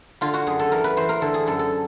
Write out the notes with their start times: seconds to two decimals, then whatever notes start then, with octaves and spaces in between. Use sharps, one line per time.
0.21 D3 F4
0.34 F#4
0.47 F#2 G#4
0.60 A4
0.72 E3 A#4
0.84 B4
0.97 E3 C5
1.09 A#4
1.21 D3 A4
1.34 G#4
1.47 F#2 A4
1.59 A4